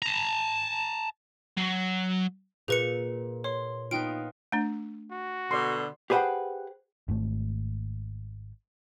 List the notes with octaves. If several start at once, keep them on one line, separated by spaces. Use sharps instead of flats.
A5 A#5
F#3
A#2 G#4 B4 C#7
C#5 C6
B3 D#4 F4 G5 D7
A3 D4
F#4
B2 D3 D5 C6
G4 G#4 B4 C5 F#5 G5
G#1 G#2 A3